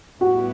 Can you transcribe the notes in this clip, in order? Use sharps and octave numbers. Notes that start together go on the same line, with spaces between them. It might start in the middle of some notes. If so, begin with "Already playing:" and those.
A2 G3 B3 E4 F#4